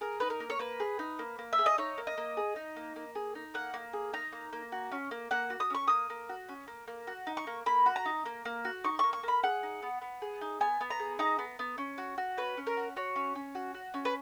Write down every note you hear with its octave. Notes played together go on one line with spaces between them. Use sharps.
G#4 A#4
D#4 B4
A#4
A#3
C#5
A#3 B4
G#4
D#4
A#3
A#3
E5
G#4
D#5
D#4 C#5
A#3
D#5
A#3
G#4
D#4
A#3
A#3
G#4
D#4
A#3 F#5
A#3
G#4
D#4 A#5
A#3
A#3
F#4
C#4
A#3
A#3 F#5
F#4
D#6
C#4 C#6
A#3 D#6
A#3
F#4
C#4
A#3
A#3
F#4
D#4
C#6
A#3
A#3 B5
F#4
A#5
D#4
A#3
A#3
F#4
D#4 C#6
A#3 C#6
C#6
A#3 B5
G#4 F#5
D#4
B3
B3
G#4
D#4
B3 G#5
B3
A#5
G#4
D#4 A#5
B3
B3
C#4
F#4
F#4
C#4 B4
C#4
A#4
F#4
F#4 C#5
C#4
C#4
F#4
F#4
C#4
B4